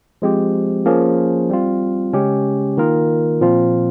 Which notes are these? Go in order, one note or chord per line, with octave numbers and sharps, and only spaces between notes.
F3 G#3 C4 G4
F3 A#3 C#4 G#4
G3 C4 F4
C#3 G#3 C#4 G4
D#3 A#3 F4 A#4
A#2 F3 C4 F4